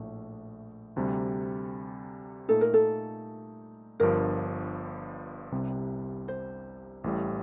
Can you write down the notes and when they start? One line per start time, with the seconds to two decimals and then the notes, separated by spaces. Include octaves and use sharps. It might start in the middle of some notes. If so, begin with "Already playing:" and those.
Already playing: A#1 A2 A3
0.96 D2 C3 G3
2.48 A#2 A3 D#4 A4
2.61 A#4
2.74 A4
4.00 G1 G2 F3 A#4
5.52 C2 C3 G3
6.28 C5
7.04 A1 A2 G3